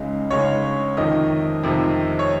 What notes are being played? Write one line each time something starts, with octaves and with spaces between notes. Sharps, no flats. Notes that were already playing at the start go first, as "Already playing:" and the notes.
Already playing: C#2 C#3 G#3 D#4
C#2 C#3 G#3 D#4 C#5
F2 C3 D#3 D#5
F2 C3 D#3
C#5